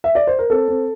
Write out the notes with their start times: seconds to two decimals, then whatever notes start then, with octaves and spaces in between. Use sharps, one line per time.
0.04 E5
0.15 D5
0.27 C5
0.39 A#4
0.50 C4 A4
0.68 C4